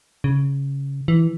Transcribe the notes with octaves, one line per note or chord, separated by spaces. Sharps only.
C#3
E3